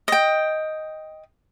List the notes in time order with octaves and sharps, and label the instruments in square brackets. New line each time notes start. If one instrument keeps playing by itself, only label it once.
[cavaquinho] D#5 G5